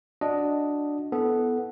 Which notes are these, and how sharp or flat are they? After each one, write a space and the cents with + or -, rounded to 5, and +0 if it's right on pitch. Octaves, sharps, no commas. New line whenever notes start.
D4 +0 F#4 -15 D#5 +0
B3 +0 E4 +0 A4 -15